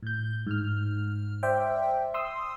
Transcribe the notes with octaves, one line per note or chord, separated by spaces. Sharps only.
A2 G6
G#2 F6
C5 D5 E5 G5
C6 D#6 E6